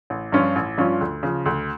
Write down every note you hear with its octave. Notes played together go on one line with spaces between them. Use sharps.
A1
G2 F3 C#4 F4
A1
G2 F3 C#4 F4
D2
C#3 F3
D2